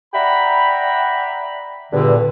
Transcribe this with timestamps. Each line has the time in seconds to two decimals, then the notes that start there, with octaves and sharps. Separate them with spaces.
0.14 D5 E5 F#5 G5 A#5 B5
1.92 E2 G2 A#2 D3